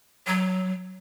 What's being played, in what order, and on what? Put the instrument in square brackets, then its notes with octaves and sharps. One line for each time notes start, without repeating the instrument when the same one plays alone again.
[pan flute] F#3